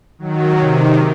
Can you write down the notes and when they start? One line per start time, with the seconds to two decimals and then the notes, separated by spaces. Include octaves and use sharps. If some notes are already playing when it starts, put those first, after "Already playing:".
0.18 D#3 F#3
0.55 C3 D#3